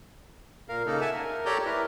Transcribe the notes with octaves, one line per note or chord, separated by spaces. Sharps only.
A#2 A#4 F5
C#3 A#3 D#4 A4
E5 F#5 G#5 A5
A#4
G4 A4 C#5 D5 A#5 G6
E4 A#4 B4